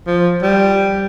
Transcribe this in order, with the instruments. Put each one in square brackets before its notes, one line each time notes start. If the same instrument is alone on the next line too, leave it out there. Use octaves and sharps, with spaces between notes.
[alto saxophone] F3
G3